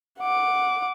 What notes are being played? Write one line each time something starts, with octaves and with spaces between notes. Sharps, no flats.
F#5 D6